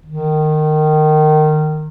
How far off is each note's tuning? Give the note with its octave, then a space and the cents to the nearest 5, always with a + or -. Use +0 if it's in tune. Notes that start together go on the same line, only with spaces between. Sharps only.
D#3 -20